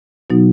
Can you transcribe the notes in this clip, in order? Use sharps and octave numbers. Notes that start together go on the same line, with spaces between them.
B2 F#3 B3 D#4 F#4